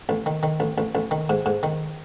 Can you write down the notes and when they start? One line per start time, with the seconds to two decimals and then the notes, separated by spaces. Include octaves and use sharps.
0.09 A1
0.26 D#3
0.43 D#3
0.60 A1
0.78 A1
0.95 A1
1.11 D#3
1.29 G#2
1.46 G#2
1.63 D#3